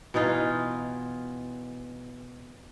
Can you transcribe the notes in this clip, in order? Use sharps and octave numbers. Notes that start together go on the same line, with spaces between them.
B2 E3 D#4 F4